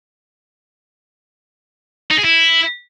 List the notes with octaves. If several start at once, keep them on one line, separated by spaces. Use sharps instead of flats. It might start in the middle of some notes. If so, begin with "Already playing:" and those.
D#4
G#4
E4